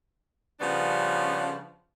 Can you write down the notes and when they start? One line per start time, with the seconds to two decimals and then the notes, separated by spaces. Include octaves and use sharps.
0.60 C#3 F3 G3 B3 C#4 D4